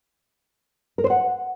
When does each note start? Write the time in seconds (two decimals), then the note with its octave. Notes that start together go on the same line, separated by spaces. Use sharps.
0.98 A#4
1.04 C5
1.10 F#5